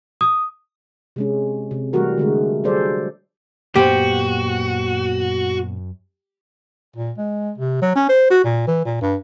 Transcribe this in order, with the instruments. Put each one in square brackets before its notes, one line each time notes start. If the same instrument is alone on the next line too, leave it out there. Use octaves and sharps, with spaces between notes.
[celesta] D#6
[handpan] C3 G#3 C#4
C3
E3 G3 A3 F#4 A#4
D3 G#3 A3
F#3 G3 G#4 A4 C5 D5
[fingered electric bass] F#2 [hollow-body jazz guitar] A#2 B3 C5 [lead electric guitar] F#4 [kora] G4
[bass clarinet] A#2
G#3
C3
F#3
C#4
C5
F#4
A#2
E3
A#2
G2